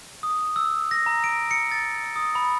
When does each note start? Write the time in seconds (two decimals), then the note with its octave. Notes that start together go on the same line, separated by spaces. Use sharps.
0.23 D#6
0.56 E6
0.91 A#6
1.06 A#5
1.24 D7
1.51 C#7
1.72 A6
2.16 D#6
2.35 B5